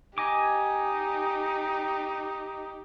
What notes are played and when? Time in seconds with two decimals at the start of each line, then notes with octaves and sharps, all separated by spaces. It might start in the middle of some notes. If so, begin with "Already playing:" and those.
0.18 D#4 G4 D#5 G#5 D6